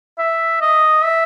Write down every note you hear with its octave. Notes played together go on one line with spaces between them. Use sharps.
E5
D#5
E5